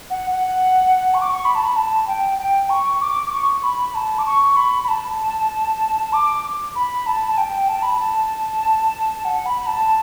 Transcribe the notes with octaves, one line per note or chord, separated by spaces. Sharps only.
F#5
F#5
C#6
D6
C#6
B5
A5
B5
A5
G5
G5
C#6
D6
D6
C#6
B5
A5
D6
C#6
B5
B5
A5
D6
B5
A5
A5
G5
A5
B5
A5
F#5
B5
B5
A5